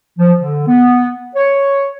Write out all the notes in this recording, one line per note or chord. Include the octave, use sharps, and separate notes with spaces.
F3
D3
B3
C#5